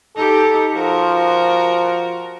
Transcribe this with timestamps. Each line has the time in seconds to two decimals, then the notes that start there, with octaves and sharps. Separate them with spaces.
0.17 D#4 G4 A4
0.74 F3 F#4 A#4